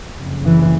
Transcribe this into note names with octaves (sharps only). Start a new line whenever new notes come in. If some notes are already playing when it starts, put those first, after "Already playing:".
F#1 F2 C#3
E3